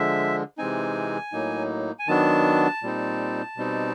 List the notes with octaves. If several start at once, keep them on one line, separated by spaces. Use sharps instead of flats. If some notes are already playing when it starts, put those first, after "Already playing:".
Already playing: D3 F3 G#3 E5
C3 E3 G#3 C4 D#4 G#5
A2 F#3 A#3 D#4
G#5
D#3 F#3 B3 D4 A5
A#2 G3 C4 D#4
B2 G3 C4 D#4